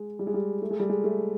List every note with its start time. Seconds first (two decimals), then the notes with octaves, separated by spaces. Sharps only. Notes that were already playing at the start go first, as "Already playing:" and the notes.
Already playing: G#3
0.19 G3
0.27 G#3
0.34 G3
0.62 A3
0.70 G#3
0.80 G3
0.89 G#3
1.04 A3